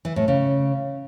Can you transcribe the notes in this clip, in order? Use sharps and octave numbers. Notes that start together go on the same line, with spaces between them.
E3
A2
C#3